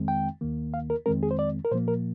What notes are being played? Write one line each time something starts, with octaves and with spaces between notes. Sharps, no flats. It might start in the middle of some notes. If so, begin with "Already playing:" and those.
Already playing: F2 D#3 G#3 C4
G5
D#2 D#3 A#3
F5
A#4
F2 D#3 G#3 C4 A#4
G#4
C5
D5
A#4
A#2 F3 A#3 C5
A#4